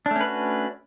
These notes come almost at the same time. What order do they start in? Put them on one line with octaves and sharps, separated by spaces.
D4 A3 C#4 B4 F#4